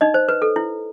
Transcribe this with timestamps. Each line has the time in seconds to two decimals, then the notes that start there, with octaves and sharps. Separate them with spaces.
0.01 D#4 D#5
0.14 C5
0.29 B4
0.42 A4
0.56 E4